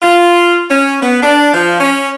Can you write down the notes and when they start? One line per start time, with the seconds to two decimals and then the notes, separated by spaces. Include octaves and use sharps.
0.01 F4
0.69 C#4
1.01 B3
1.22 D4
1.53 F3
1.80 C#4